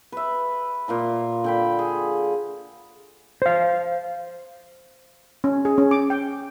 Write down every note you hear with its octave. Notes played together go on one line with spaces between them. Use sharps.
B4 E5
A#2 F4 A#5
D3 G5 B5
G#4
C5 F5
C#4
G#4
C#4
D6
G5